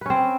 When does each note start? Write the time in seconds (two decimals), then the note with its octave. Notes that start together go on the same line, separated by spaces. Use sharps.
0.01 B4
0.06 C#4
0.10 C4